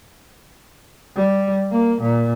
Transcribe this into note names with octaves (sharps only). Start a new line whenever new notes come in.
G3
A#3
A#2